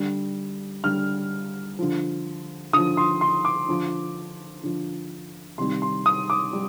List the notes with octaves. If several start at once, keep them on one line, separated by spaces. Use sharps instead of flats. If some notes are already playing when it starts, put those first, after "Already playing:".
Already playing: D3 G3
D3 G3 F6
D3 F3
D3 F3 D#6
C6
C6
D6
D3 F3
D3 F3
C3 D#3 G3 C6
C6
D#6
D6
G3